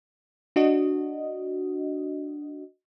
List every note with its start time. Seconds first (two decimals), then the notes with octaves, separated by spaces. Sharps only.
0.56 D4 F#4 D#5